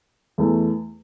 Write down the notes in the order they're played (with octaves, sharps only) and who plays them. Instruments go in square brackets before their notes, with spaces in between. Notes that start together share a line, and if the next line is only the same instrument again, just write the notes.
[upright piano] E2 E3 A3